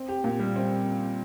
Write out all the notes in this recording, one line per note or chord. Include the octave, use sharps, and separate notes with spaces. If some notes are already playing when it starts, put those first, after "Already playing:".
Already playing: C4
G4
A#2
G3
C4